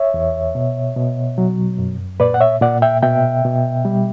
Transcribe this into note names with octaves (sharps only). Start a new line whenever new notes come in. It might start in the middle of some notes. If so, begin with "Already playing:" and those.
Already playing: C#5 E5
E2
B2
B2
F#3
F#2
A#2 B4 D5
F#5
C#5 E5
A#2 D5 F#5
E5 G5
B2 E5 G5
B2
G3